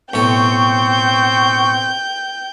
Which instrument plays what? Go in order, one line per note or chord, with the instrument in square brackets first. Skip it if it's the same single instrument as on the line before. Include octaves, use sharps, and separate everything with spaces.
[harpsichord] B1 A2 A4 [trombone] C4 [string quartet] G5 G6 [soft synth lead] C#6